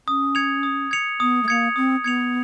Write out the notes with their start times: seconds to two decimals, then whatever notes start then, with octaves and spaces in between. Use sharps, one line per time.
0.08 C#4 D#6
0.35 G#6 C#7 F7
0.63 D#6
0.91 G#6 C#7 F7
1.20 B3 D#6
1.43 A3
1.48 A#3 G#6 C#7 F7
1.76 C4 D#6
2.04 B3 G#6 C#7 F7